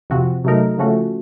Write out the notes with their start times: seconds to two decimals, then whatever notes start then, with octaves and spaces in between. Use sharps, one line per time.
0.10 F2 C3 F3 C4 F#4
0.44 C3 F#3 A3 D#4 A#4
0.78 C#3 F3 A3 C#4 F#4